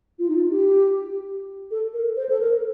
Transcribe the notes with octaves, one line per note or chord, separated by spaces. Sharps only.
F4
D#4
F4
G4
A4
A#4
C5
A4
A#4